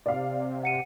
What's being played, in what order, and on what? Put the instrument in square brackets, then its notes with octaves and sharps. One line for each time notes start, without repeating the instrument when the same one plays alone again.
[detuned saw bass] C3 [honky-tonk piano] D5 F5
[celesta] F#5 C#7 D#7